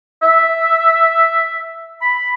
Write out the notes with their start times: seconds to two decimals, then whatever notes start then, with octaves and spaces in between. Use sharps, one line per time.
0.23 E5
2.02 B5